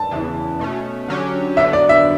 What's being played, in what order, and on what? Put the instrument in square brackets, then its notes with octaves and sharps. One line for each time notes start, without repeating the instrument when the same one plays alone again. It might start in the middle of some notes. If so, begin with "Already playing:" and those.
Already playing: [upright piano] A5
[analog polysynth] E2 C#3 E3
B2 A3 C#4
D3 F#3 C#4 G4
[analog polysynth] D3 F#3 B3 [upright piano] E5
[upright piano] D5
E5